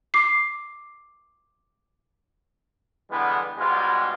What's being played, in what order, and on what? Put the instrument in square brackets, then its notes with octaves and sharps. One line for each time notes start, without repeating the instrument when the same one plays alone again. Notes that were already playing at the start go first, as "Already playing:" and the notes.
[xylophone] D6 C7
[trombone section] D3 E3 G3 G#3 B3
G#2 B2 G3 G#3 F4